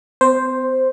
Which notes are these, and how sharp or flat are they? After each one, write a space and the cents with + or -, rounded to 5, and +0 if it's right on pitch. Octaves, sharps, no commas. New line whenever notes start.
C4 -45 C5 +0